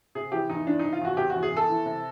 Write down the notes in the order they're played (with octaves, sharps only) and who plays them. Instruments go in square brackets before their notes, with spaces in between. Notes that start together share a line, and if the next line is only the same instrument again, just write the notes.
[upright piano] C3 G#4
E3 G4
E2 D#4
E3 D4
C3 D#4
F4
E2 F#4
C3 G4
E2 F#4
G#4
E2
A4
E3
C3